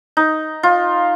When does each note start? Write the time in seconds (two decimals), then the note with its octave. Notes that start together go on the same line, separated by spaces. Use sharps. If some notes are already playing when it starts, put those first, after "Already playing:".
0.17 D#4
0.63 F4